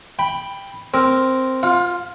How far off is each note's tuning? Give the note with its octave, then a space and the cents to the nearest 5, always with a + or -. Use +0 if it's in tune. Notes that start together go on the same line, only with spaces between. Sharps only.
G5 +10 B5 +0
C4 +0 A#4 +0
F4 +0 F5 +35